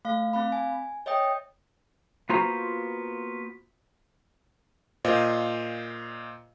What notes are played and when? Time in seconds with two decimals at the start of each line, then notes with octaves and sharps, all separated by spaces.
0.05 A3 F5
0.33 C4 F5 B5
0.52 G#5
1.06 C#5 D#5 E5 G5 D#6
2.29 A#3 B3 F4 F#4 C5 A#5
5.05 A#2 F4 C5 D#5